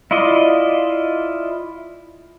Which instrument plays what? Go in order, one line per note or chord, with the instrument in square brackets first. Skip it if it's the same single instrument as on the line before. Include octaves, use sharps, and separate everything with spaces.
[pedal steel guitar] E4 F4 D5 D#5